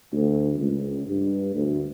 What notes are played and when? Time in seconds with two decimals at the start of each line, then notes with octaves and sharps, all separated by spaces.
0.12 D2
0.59 C#2
1.07 G2
1.55 D2